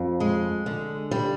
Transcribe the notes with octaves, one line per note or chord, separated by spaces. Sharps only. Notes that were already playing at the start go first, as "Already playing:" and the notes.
Already playing: F2
G#3
D3
G3